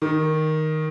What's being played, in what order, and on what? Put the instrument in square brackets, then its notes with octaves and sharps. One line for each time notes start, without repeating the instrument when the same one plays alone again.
[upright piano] D#3